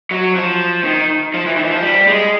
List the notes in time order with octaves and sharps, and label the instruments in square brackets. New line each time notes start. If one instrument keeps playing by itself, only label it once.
[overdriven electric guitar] F#3
F3
D#3
F3
E3
D#3
E3
F3
G3
G#3